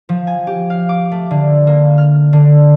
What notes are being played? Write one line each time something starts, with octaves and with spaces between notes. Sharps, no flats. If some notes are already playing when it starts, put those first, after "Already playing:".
F3
G#5
G4
F5
D6
A3
D3
A#3
F6
D3